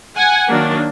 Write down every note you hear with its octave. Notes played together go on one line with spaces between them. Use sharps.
F#5 G#5
D#3 F#3 A#3 D4